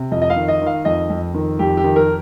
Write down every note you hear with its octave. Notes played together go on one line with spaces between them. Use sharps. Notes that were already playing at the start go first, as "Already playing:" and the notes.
Already playing: C3
F2 D#5
D#5
F5
D#3
D#5
D#3 F5
F2 D#5
F2
D#3
F2 G4
G4
D#3
A#4